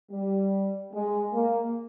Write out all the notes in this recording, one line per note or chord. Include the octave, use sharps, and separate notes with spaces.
G3
G#3
A#3